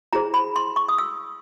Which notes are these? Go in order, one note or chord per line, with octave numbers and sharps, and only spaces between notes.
E4 G#4 C5 A#5
B5
C6
C#6
D#6
E6